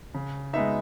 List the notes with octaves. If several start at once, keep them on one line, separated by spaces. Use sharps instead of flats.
C#3
G#3 B3 D#4 E5